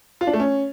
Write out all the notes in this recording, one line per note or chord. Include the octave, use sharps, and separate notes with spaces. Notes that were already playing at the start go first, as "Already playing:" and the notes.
F4
D4
A3
C#4